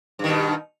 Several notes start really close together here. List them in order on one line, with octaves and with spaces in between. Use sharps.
G2 D#3 B2